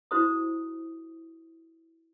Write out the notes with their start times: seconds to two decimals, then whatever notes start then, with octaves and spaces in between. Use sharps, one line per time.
0.11 E4 F#4 C5 A#5 D#6